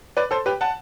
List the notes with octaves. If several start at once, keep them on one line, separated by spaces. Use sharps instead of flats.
B4 D5
A4 C5
G4 B4
F#5 A5